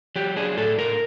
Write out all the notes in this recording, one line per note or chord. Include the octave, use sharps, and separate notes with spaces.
F#3 G4
D4 G#4
A2 A4
A2 A#4